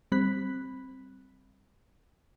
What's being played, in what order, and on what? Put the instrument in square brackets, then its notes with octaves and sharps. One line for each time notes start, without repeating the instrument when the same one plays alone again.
[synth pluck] G3 C4 B5 F#6 B6